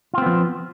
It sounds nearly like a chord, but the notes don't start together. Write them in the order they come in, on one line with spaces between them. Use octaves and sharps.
F4 C4 B3 F3